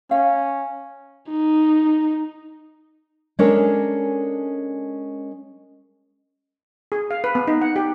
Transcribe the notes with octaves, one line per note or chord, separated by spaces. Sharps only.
C#4 F5
D#4
G#3 C#4 D4 A4 A#4 C#5
G#4
F5
B4
B3
D#4
F#5
G4